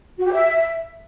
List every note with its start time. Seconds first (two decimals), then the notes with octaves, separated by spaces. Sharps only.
0.18 F#4
0.25 G4
0.32 E5